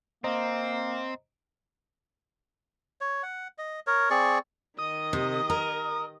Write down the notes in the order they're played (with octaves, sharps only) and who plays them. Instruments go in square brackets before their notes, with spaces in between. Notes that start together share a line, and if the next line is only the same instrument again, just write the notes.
[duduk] A#3 [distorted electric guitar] C4 [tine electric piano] C5 D#5 A#5
[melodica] C#5
F#5
D#5
A#4 C#5
C4 G#4 D5 C#6
[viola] D#3 D#5 [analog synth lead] D#6
[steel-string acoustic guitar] C3
A#4